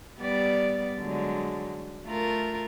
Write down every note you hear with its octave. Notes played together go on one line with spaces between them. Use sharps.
G3 B3 D5
D3 F#3 G#3
A3 F4 A#4